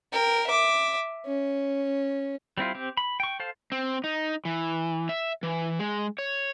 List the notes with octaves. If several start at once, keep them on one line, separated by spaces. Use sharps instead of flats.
A#4 G5
E5 D6
C#4
G3 C4 E4 F4
C4 G4
B5
G5 C#6
A4 C5 F5 A5
C4
D#4
E3
E5
E3
G#3
C#5